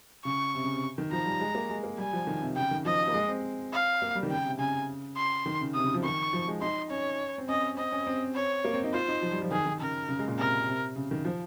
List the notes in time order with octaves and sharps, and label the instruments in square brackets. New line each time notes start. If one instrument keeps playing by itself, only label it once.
[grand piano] C#3 [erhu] C#6
[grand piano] C3
C#3
C3
D#3
[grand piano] F3 [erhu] A#5
[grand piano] G3
G#3
A#3
G#3
A#3
[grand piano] G3 [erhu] G#5
[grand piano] F3
D#3
C3
[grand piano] C#3 [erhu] G5
[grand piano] D#3
[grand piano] F3 [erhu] D#5
[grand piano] A#3
G#3
C4
[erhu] F5
[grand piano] A#3
G3
D#3
[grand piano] C#3 [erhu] G5
[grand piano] C3
[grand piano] C#3 [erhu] G#5
[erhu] C6
[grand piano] D#3
C#3
[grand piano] C3 [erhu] D#6
[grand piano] C#3
F3
[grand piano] D#3 [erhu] C#6
[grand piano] F3
G#3
[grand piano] D#4 [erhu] C6
[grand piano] C#4 [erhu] C#5
[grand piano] C4
[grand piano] C#4 [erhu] D#5
[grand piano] C4 [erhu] D#5
[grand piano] C#4
C4
[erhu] C#5
[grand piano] A#3
C4
D#4
[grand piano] F4 [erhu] C5
[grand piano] D#4
F3
G3
F3
[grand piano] D#3 [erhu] G#4
[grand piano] D#3
[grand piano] C#3 [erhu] A#4
[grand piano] C#3
G#3
A#2
[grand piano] C3 [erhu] A#4
[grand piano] C3
C#3
D#3
F3